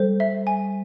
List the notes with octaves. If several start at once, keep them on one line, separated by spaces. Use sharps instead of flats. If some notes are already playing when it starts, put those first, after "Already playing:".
Already playing: G3 A4 C5
E5
G#5